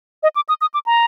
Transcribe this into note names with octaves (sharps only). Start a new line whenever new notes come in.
D#5
D6
D#6
D#6
D6
A#5